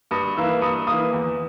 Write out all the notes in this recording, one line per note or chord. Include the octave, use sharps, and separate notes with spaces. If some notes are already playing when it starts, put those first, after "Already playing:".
G2 D#6
E3 A#3 E6
G2 D#6
E3 A#3 D#6
E2